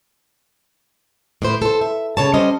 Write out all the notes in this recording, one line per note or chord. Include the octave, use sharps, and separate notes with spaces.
A2 B4 C5
A4 C5
E5
C#3 C#5 A5
G3 C#4 C5 D#5